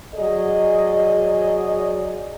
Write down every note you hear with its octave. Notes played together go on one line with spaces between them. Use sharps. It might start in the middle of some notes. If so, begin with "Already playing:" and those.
F#3 G#4 D5 D#5